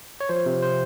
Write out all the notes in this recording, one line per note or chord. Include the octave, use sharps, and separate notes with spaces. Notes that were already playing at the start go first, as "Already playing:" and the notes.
C#5
F3 C5
C3
C5